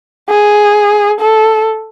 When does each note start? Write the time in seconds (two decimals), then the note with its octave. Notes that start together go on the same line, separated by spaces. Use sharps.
0.29 G#4
1.20 A4